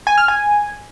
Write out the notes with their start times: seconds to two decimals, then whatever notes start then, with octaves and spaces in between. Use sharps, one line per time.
0.07 G#5
0.18 F6
0.28 G#5